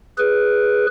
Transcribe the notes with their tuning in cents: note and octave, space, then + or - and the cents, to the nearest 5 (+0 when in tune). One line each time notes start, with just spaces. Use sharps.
G#4 +0 B4 +0